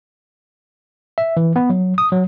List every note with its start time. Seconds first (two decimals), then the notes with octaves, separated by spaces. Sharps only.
1.18 E5
1.37 E3
1.56 B3
1.70 F#3
1.98 D#6
2.12 F#3